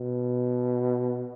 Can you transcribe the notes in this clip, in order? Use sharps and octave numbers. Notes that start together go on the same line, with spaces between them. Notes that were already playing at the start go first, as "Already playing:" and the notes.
Already playing: B2